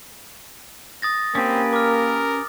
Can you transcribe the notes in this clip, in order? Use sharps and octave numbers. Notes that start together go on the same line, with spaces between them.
D#6 A6 A#6
A#3 C4 C#4 G4 B4
A#4 D6 F6